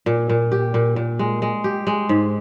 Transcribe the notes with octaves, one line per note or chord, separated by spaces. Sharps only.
A#2
A#2
G4
A#2
A#2
G#3
G#3
G4
G#3
G#2